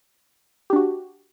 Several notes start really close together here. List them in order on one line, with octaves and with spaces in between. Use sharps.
G4 D4 F#4